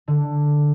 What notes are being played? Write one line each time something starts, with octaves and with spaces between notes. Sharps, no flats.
D3